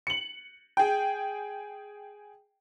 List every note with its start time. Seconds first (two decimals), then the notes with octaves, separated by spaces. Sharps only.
0.07 C#7 F#7
0.77 G#4 G5